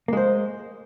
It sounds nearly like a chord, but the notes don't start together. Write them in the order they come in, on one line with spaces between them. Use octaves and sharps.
A#3 G#3 C5